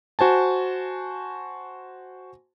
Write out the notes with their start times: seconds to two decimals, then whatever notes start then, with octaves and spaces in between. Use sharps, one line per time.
0.19 F#4 C5 G#5 A5